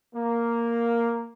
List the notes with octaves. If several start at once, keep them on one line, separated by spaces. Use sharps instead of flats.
A#3